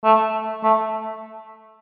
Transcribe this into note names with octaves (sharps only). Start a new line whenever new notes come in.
A3
A3